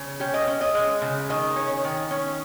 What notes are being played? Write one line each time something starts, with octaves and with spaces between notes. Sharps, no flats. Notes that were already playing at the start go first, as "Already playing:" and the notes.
Already playing: C#3
C#4 G4
D#5
C#4
D#5
G#3
C#3
D#3 D#5
C#4
D#3
C#4